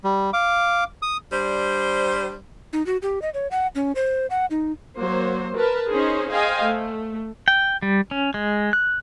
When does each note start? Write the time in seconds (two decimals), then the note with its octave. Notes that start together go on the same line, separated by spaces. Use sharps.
0.04 G3
0.33 F5 D6
1.02 D#6
1.32 G3 D4 C5
2.73 D#4
2.86 F#4
3.02 G4
3.22 D#5
3.34 C#5
3.51 F#5
3.75 C#4
3.95 C5
4.30 F#5
4.51 D#4
4.99 F#3 A#3 C5
5.55 A#4 B4 A5
5.90 C#4 D#4 G#4 C5
6.31 G#4 C5 D#5 F5 G5 G#5
6.64 A3
7.48 G5
7.82 G3
8.11 C#4
8.34 G#3
8.73 F#6